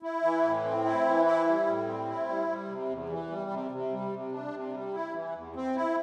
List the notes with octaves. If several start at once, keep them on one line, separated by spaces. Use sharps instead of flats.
E4
E3
A2
C4
E4
E3
E4
G3
A2
C4
E4
G3
G3
C3
E2
E3
G3
C3
C3
G3
C3
D4
C3
G3
E4
E3
E2
C4
E4